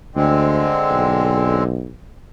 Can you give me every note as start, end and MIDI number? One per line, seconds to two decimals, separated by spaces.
0.15 0.67 38
0.15 1.64 50
0.15 1.64 56
0.15 1.64 60
0.90 1.90 35